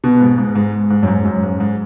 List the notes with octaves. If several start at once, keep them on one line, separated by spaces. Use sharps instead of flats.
B2
G#2
G#2
G#2
G#2
F#2
G#2
F#2
G#2
G#2